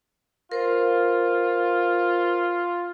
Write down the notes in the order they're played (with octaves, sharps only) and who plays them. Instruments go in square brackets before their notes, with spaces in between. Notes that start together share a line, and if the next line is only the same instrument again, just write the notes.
[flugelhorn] F4 [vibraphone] A#4 C5